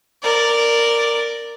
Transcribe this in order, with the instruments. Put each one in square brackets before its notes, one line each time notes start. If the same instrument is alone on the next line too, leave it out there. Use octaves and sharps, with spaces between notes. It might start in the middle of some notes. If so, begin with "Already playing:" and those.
[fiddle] A#4 D5